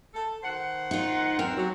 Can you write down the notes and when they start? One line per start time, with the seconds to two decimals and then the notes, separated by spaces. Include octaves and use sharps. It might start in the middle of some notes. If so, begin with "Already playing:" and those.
0.14 A4
0.43 D#3 C5 F#5
0.91 D#4 F4
1.39 E2 C4 A#4
1.57 F#3